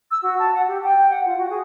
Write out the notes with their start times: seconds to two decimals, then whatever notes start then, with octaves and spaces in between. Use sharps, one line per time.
0.11 E6
0.22 F#4
0.39 A5
0.54 F#5
0.68 G4
0.84 G5
1.10 F#5
1.26 F4
1.38 F#4
1.50 G#4